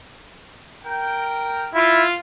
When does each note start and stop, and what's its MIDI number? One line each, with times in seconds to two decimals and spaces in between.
0.83 1.69 70
0.83 1.69 79
1.74 2.03 64
1.74 2.17 65